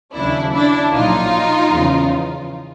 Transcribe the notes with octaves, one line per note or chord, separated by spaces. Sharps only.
D#2 C#3 F#3 D4 E4
D4 E4
A#1 A#2 F#3 D#4 F4
E2 C#3 F3